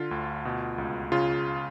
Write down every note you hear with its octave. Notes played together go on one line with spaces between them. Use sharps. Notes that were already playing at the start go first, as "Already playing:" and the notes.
Already playing: D3 F4
D2
B2
C#2
C#3 F4